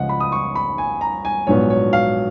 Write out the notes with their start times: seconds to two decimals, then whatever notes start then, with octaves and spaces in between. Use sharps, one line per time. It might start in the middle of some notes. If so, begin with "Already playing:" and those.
Already playing: C#2 C#3 F3 D#5 F#5
0.09 B5
0.20 D#6
0.32 C#6
0.55 B5
0.78 G#5
1.01 A#5
1.25 G#5
1.47 A#1 G#2 F#3 B3 C#5
1.70 C#5
1.93 F5